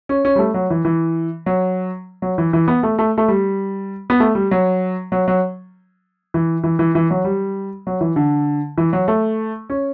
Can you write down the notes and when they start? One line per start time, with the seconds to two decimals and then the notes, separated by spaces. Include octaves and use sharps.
0.09 C#4
0.25 C#4
0.36 G3
0.39 A3
0.54 F#3
0.70 E3
0.85 E3
1.46 F#3
2.22 F#3
2.38 E3
2.53 E3
2.68 B3
2.83 A3
2.99 A3
3.18 A3
3.28 G3
4.10 B3
4.20 A3
4.35 G3
4.51 F#3
5.12 F#3
5.28 F#3
6.34 E3
6.64 E3
6.79 E3
6.95 E3
7.10 F#3
7.25 G3
7.87 F#3
8.01 E3
8.16 D3
8.78 E3
8.93 F#3
9.08 A3
9.70 C#4